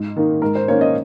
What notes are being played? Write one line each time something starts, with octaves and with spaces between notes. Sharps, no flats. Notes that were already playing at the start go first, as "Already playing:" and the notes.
Already playing: G#2
D#3 A#3 D#4
G#2 A#4
C5
D#3 A#3 C#4 C#5
D#5